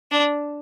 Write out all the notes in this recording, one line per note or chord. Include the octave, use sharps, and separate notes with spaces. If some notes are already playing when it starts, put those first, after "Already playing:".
D4